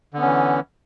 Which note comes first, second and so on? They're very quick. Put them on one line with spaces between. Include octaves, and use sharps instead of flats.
D3 B3 C#4 E3